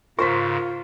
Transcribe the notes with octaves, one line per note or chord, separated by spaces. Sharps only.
G#2 C#3 F4 A#4 C5 C#6 B6